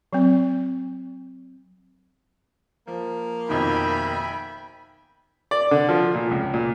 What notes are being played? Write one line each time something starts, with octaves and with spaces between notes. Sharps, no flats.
F#3 C4
F3 A#3
F2 B2 D#3 E5 G5 G#5 B5
D5
D3
F3
A#2
C#2
A#2